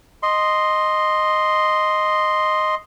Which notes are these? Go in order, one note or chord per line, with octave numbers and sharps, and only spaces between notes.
D#5 C6